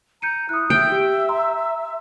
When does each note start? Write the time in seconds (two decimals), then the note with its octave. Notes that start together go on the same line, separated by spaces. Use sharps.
0.22 A#5 G6 C#7 D#7
0.49 E4 D#6 F#6
0.70 E5 G5
0.91 G4
1.29 A#5 C6 E6